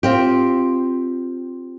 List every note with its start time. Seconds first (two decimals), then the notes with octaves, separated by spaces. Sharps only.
0.03 C4 F4 G4